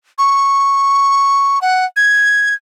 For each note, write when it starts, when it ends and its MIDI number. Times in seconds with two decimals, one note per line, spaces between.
0.18 1.59 85
1.62 1.85 78
1.96 2.54 92